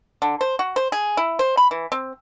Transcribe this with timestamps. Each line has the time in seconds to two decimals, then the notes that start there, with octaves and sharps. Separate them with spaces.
0.22 D3
0.41 C5
0.59 F#4
0.76 C5
0.92 G#4
1.17 E4
1.39 C5
1.57 B5
1.71 E3
1.92 C4